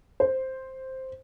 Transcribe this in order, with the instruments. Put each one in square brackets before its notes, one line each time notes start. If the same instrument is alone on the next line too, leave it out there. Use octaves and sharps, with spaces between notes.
[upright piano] C5